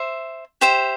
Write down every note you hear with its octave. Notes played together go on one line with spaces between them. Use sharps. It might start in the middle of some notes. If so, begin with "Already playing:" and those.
Already playing: C5 E5
G4 C5 E5